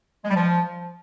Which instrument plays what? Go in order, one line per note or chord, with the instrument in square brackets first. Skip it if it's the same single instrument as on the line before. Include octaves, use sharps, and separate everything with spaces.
[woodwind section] G#3
G3
F3